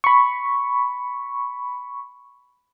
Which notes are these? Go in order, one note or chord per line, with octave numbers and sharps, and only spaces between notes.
B5 C#6